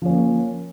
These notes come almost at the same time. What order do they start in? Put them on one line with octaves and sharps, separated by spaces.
F3 C#4 A#3